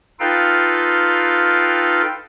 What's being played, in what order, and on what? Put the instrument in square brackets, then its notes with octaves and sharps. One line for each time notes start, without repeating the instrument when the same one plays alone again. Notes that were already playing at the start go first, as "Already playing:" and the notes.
[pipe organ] D#4 F4 A4 B4 F5 G5